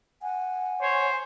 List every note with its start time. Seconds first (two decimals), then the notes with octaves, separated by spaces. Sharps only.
0.22 F#5 G#5
0.82 C5 C#5